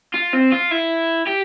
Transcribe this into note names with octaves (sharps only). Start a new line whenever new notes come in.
F4
C4
F4
E4
G4